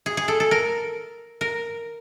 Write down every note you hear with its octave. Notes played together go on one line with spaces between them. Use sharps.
G#4
G#4
A4
A4
A#4
A#4